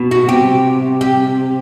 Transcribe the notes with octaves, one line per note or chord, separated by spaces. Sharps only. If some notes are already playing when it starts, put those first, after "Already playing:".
Already playing: B2
F#4
C3 G4
G4